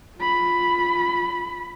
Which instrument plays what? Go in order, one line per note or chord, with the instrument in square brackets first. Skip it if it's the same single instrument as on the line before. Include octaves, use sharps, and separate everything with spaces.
[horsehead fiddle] F4 B5